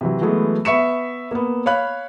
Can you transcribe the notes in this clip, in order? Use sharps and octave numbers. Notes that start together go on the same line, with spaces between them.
C3 E3 F#3
E3 F#3 G#3 A3 B3
B3 E5 C#6 C#7 E7
A#3 B3
C#5 F5 B5 F#6